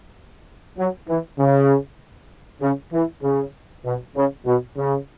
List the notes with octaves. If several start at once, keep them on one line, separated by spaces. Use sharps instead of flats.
F#3
E3
C#3
C#3
E3
C#3
B2
C#3
B2
C#3